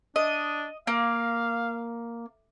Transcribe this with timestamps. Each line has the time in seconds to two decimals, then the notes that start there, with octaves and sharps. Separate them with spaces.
0.16 D4 D#5
0.87 A#3 F5